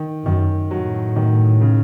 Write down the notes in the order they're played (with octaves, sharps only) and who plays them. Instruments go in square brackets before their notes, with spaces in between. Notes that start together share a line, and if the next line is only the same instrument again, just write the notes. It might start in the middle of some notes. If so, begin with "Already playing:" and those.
Already playing: [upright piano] D#3
[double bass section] F#2 [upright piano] D#3
[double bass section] A2 [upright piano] F#3
[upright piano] D#3
C#3